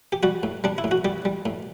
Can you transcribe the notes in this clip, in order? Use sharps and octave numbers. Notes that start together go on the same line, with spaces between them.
G4
G3 F#4
A2
G3 D4
E4
A2
F#4
G3 G4
G3
A2